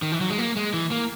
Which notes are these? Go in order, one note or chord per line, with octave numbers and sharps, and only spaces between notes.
D#3
E3
F#3
G#3
A#3
G#3
E3
A#3